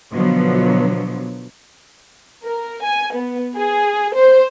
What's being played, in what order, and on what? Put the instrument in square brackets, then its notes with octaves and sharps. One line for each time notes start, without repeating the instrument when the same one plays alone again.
[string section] B2 D3 F3 F#3 B3
[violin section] A#4
G#5
B3
G#4
C5